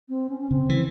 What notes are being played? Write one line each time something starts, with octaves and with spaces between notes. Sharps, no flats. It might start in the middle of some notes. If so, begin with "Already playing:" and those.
C4
C#4
C#4
C#3 C4
E3